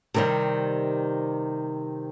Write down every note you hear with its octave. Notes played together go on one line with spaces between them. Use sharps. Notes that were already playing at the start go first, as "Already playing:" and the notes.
C3 D#3 G3